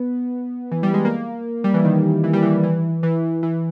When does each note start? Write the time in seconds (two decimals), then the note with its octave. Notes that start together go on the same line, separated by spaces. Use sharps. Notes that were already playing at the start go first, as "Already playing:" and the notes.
Already playing: B3
0.72 E3
0.83 G3
0.94 G#3
1.05 A#3
1.64 G3
1.74 E3
1.85 D#3
2.24 E3
2.33 G3
2.42 E3
2.63 E3
3.03 E3
3.43 E3